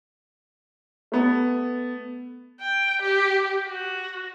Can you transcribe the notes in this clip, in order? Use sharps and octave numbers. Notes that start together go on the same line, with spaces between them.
A3 B3
G5
G4
F#4